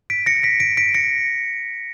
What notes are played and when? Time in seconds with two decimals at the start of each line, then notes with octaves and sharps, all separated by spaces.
0.10 B6 D7
0.26 A#6 C#7
0.43 B6 D7
0.60 B6 D7
0.77 B6 D7
0.94 A#6 C#7